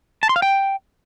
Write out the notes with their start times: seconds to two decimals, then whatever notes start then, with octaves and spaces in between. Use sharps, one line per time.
0.23 A5
0.29 C6
0.36 F5
0.42 G5